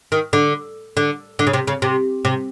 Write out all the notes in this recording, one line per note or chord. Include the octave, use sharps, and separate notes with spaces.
D#3
D3
D3
D3
C#3
C3
C#3
C3
C3